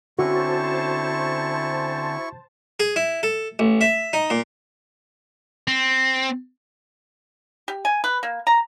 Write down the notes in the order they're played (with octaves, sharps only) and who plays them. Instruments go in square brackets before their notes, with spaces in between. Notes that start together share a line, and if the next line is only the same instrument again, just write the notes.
[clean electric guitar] D3 C4 C#4 [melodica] E4 C#6 [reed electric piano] F#4 [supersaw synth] C5 A5
[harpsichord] G#4
E4
A4
A1
E5
D#4
A#2
[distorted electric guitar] C4
[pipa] G4
G#5
B4
A#3
A#5